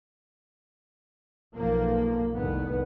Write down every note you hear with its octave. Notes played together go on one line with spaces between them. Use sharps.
B1 F3 A#3
F1 C2 D#3 B3